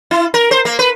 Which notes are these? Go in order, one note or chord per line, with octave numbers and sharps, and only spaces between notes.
E4
A#4
C5
A#3
B4